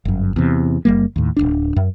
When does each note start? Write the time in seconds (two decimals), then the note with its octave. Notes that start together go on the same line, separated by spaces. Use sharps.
0.05 G1 F#2
0.36 E2 C3
0.85 F#1 G3 A#3
1.16 D#2 A2
1.37 D1 G1 D4
1.76 F#2